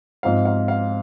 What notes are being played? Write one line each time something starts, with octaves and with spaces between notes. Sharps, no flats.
G#2 F3 C4 D#4 F5
F5
F5